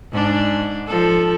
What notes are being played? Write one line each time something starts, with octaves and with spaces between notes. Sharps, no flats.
G#2 D4
F3 A4